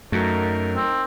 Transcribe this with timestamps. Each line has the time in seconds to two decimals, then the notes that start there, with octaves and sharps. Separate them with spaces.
0.12 F#2 F#3 A3 D#4 A#4
0.76 C4